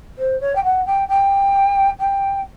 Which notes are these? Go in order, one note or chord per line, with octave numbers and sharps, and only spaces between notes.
C5
C#5
G5
F#5
G5
G5
G5